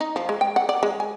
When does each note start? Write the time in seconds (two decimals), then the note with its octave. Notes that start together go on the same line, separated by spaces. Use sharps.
0.01 D#4
0.16 F3
0.29 G#3
0.41 G5
0.56 F#5
0.69 D5
0.83 G#3
1.00 G#5